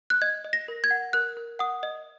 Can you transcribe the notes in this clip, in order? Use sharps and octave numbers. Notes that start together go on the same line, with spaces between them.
F#6
D#5 G#6
D#5
A#6
A#4
G#6
F#5
A#4 F#6
A#4
F#5 D#6
D#5